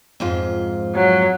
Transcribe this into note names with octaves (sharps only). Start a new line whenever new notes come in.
F2 G#2 F4
F#3